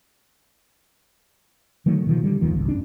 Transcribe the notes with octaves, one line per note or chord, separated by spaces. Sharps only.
D3 D#3 F#3 A3
B2 D#3 F3
D3 G3
F1 D#2 D#3 F3
G#1 C#2
F#1 C#4 D4